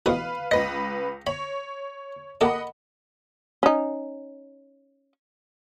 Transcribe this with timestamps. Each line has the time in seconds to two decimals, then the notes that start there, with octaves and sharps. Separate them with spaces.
0.06 A1 B2 B4 F5 D#6
0.51 C#2 B4 D#5 A#6
1.27 C#5 B5
2.41 A#3 G4 A4 D#5 F#5 B5
3.63 C#4 D#4